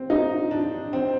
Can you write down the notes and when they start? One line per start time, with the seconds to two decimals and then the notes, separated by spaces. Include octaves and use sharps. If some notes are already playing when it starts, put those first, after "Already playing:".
Already playing: C4
0.10 D#4
0.51 D4
0.93 C4